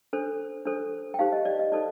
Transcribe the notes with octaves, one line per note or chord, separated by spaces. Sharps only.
D4 A4 C5
D4 A4 C5
G5
D#4 G4 C5 F5
D#5
D5
D#5
D#4 A4 C5 D5